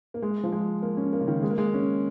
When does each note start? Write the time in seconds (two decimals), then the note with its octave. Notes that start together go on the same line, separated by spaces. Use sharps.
0.14 A#3
0.22 G#3
0.43 F3
0.52 G#3
0.82 A#3
0.97 C#4
1.13 A#3
1.21 C#3
1.28 D#3
1.43 G#3
1.50 A#3
1.58 G#3
1.74 C#4